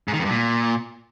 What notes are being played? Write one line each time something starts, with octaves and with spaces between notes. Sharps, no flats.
G#2
D#3
F2
G2
A#2